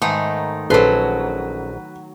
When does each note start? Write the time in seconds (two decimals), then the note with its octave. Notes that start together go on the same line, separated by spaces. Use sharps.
0.02 G#2 D#3 A3 B3 D#4
0.70 A#1 F#3 C#4 A4 B4 C6